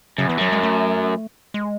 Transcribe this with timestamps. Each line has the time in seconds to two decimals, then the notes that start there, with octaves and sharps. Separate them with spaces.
0.18 F#2 C#3
0.28 E2 E3
0.38 F#2 F#3
0.52 G#3
0.63 A3
1.54 G#3